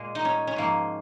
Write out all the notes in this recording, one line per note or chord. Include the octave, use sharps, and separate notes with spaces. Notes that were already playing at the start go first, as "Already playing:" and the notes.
Already playing: A#2 G#3
D#4
C#4
C#4
G#2 F3 G#3 A#3